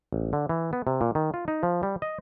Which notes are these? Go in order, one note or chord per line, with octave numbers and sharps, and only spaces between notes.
A1
D3
E3
B3
C3
A#2
D#3
F4
D#4
F3
G3
D#5